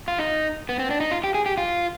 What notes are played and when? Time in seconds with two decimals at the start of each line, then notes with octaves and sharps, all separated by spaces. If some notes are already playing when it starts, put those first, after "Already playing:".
0.08 F4
0.19 D#4
0.69 B3
0.79 C4
0.90 D4
1.00 D#4
1.11 F4
1.24 G4
1.34 G#4
1.46 G4
1.57 F4